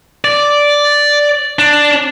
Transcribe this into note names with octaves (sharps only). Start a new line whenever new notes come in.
D5
D4